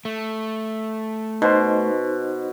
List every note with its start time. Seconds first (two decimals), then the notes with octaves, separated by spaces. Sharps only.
0.05 A3
1.42 B2 D#4 C5